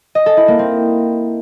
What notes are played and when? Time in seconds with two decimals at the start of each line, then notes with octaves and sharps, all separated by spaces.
0.15 D#5
0.26 A4
0.37 E4
0.48 A#3
0.59 C4